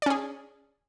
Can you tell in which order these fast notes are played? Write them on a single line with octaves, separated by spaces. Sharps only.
D5 C#4 G#4